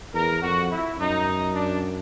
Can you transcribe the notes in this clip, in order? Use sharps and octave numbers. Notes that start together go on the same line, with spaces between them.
E2 A#4
F2 F#4
E4
F#2 D#4
D4